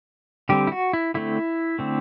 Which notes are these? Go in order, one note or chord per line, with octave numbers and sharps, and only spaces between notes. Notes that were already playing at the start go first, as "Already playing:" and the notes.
D3 G3 C4 G4
E4
F#4
E4
D3 A3 C4 E4
D3 A3 C4